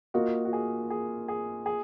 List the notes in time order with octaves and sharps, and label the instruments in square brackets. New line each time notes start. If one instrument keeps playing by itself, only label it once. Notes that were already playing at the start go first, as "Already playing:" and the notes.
[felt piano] A#3 F4 A#4 D#5 [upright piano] F#4
[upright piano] F#4
G#4
G#4
G#4
G#4